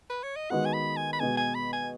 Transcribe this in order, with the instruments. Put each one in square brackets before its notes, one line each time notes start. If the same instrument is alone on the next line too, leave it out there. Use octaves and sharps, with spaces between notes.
[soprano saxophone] B4
C#5
D#5
[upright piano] D#3 G#3 B3 F#4 [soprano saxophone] F#5
[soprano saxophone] G#5
B5
G#5
B5
[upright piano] B2 G#3 B3 [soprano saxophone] G#5
[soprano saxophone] G#5
B5
G#5